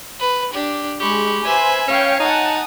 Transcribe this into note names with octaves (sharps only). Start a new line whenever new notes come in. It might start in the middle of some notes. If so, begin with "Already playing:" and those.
B4
D4 G4
G#3 G4 B5 C#6
B4 C5 E5 G#5
C#4 C#5 F5 G5
D#4 F#5 G#5 A5 D#6